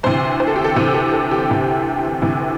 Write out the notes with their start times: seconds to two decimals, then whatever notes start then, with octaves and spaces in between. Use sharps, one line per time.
0.03 D2 C3 E3 C5
0.40 C5
0.47 A4
0.56 G4
0.64 A4
0.76 D2 C3 E3 G4
0.94 A4
1.13 A4
1.31 G4
1.50 D2 C3 E3
2.22 D2 C3 E3